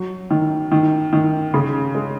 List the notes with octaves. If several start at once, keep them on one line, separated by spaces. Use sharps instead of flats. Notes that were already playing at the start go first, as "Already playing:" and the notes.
Already playing: F#3
D#3
D#3
D#3
C#3
G#3